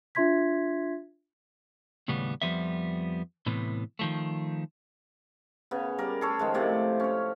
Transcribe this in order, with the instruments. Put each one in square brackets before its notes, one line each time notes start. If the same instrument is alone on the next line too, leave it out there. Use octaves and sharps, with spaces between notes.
[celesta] D4 F4 E5 C6 G#6 B6
[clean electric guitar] D#2 A2 C#3 G3 B3
F2 F3 G3 B3 E5
A2 C3 E3 B3
D#3 F3 A3
[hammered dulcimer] C#3 B3
G3 A#4 D5
G#4 A4 C#5
D#3 F3 G#3
A2 C3 D5
C#4 C#5